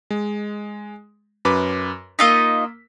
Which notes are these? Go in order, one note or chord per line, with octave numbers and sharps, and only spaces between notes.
G#3
F#2 B4 D6
A#3 D#4 F4 D#5 E6 B6